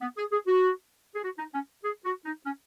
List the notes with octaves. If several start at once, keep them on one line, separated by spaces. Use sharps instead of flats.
B3
G#4
G#4
F#4
G#4
F#4
D#4
C#4
G#4
F#4
D#4
C#4